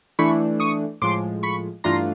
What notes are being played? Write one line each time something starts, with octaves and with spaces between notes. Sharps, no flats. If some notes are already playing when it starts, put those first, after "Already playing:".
E3 A3 D4 B5 C#6
C#6 D#6
A2 F3 G#3 C6 D6
B5 C#6
G2 E3 A3 D4 F4 A#5 C6